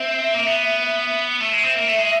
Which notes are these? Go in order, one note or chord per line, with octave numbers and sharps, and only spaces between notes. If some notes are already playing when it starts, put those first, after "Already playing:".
Already playing: C4 E5
A#3
B3
A3 E5
G#3
C4
A#3
A3
G#3